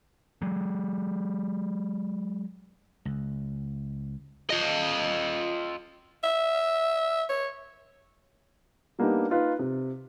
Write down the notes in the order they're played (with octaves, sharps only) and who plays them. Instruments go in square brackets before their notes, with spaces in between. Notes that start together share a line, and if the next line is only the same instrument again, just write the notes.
[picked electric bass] F#3 G#3
[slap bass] C#2
[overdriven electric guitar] F4 D#5
[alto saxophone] E5
C#5
[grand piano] G3 A#3 B3 D4 D#4 G4
D#4 F4 B4
C3